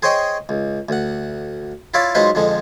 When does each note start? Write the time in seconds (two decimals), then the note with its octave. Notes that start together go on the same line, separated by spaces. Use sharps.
0.02 G#4 C5 C#5 D#5 G5 C#6
0.49 C#2
0.89 D2 F#5
1.94 E4 F4 C#5 D5 E5 F5
2.15 F#3 G#3 D#4 F4 B4 C5
2.35 F2 D3 F3 G#3